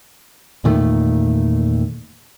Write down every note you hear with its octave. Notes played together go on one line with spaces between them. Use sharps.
E2 A#2 D#3 A3